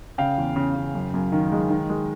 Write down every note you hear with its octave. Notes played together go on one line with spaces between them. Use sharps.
C#3 F5 G5
E2
C#3
C#3
F#2
F#2
D#3
G#3
D#3
G#3